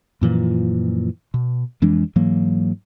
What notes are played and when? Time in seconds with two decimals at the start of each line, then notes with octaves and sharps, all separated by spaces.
0.21 F#2 A#2 E3 F3
1.34 B2
1.82 F2 E3 G#3 D4
2.16 G#2 E3 F#3 A#3